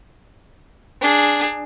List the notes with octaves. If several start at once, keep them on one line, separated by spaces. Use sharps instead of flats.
D4 G#4